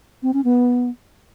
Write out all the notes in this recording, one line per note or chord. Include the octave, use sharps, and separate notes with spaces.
C4
C#4
B3